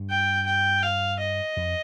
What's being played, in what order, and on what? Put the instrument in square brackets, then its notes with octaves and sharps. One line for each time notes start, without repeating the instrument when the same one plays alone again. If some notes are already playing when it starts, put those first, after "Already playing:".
Already playing: [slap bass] G2
[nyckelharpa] G5
G5
F5
D#5
[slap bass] F2